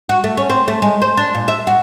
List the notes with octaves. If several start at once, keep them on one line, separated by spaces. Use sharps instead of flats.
F#4
A3
C#4
C4
A3
G#3
C5
D4
A#2
E5
F#4